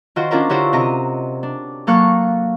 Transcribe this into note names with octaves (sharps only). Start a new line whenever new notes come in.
D#3 F4 F#4 C5
C#4 D4 F4 A#4 C5
D3 C#4 E4 F#4 G4 C5
C3 A#4 D#5 A#5
D4
F#3 A#3 A4 F5 C#6 F#6